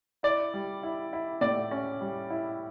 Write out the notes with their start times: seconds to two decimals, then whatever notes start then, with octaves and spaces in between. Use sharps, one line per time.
0.23 E4 D5
0.54 G3
0.83 E4
1.13 E4
1.41 A2 D5
1.71 C#4
2.01 G3
2.30 E4